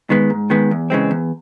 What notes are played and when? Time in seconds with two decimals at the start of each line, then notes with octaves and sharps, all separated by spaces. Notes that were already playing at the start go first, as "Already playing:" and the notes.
0.10 D#3 G#3 B3
0.30 G#2
0.50 D#3 G#3 B3
0.71 E2
0.90 C#3 E3 G#3 C4
1.11 E2